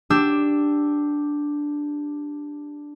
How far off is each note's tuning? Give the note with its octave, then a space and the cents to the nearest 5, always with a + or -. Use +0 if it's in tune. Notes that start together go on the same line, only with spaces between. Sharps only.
D4 +0 G4 +5 E6 +0